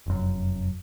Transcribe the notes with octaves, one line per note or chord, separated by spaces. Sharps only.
F1 F#2